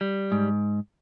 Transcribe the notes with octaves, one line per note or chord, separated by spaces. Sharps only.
G3
G#2